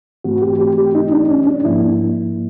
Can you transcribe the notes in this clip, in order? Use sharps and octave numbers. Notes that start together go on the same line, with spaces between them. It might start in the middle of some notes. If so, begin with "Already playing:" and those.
G#2 E3 A3 C4 F#4
G4
G4
G4
D#4
D4
C#4
D4
G#2 F3 A#3 E4